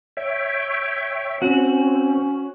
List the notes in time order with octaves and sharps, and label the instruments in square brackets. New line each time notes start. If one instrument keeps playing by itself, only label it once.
[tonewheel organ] C#5 E5 G5
[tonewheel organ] C4 [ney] C#4 [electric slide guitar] F#4